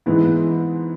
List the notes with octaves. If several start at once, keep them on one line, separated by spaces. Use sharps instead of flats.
G#2 E3 G#3 B3 E4